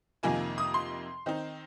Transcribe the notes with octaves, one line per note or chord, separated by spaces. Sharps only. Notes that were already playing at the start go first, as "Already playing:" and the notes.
F2 C3 D#3 A#3 F4 G#5
D#6
C6
D#3 C4 D#4